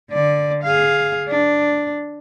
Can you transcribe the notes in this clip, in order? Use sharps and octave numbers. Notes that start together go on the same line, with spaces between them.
D3 D5
G#4 F5
D4